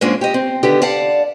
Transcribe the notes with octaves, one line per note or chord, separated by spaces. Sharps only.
G#2 F3 G#3 A#3 C#4 D4
G4 D#5
C4
D3 D#3 B3 G4
D5 F5 F#5 A5